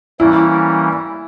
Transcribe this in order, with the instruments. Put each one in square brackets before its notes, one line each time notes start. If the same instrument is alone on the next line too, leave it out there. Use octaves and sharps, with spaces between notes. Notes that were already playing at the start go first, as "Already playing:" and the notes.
[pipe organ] E3 G3 A#3 C#4 [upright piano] E4